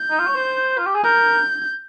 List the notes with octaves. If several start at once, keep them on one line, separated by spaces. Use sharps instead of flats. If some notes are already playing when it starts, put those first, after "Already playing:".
Already playing: G6
D#4
F4
C#5
C5
F4
G4
G#4
A#4 G6